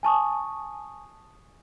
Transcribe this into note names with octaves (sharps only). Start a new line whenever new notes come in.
G#5 A5 C#6 D#6